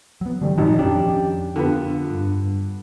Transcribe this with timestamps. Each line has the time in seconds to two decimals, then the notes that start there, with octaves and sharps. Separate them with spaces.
0.21 F#3 B3
0.42 D3 E3 G3 A3
0.58 G#1 A#2 F3 D#4
0.79 F2 C#4 D4 G4
1.56 D3 B3 F4
2.10 G2